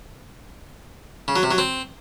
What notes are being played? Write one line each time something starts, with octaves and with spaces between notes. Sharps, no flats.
C#3
F#3
C3
F#3
C4